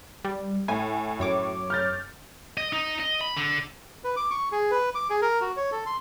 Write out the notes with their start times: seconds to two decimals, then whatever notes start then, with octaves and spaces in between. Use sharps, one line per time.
0.24 G3
0.68 A2 G#5
1.20 F#2 C#5 D6
1.70 F6 G6 A6
2.57 D#5
2.73 D#4
3.00 D#5
3.21 B5
3.37 D3
4.04 B4
4.17 D6
4.31 C#6
4.52 G#4
4.71 B4
4.95 D6
5.10 G#4
5.22 A#4
5.41 F#4
5.57 C#5
5.72 A4
5.86 C6